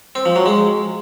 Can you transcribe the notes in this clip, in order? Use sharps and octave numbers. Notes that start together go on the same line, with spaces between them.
C4
F3
F#3
G#3